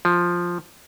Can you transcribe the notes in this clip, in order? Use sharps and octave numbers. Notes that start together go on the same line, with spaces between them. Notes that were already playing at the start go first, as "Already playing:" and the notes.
F3